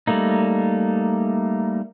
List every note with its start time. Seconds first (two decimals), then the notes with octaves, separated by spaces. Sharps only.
0.07 G3 A3 A#3 D#4